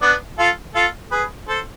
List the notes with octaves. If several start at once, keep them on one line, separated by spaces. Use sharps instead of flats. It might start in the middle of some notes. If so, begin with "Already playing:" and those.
B3 D4
F4 A4
F4 A4
G#4 B4
A4 C5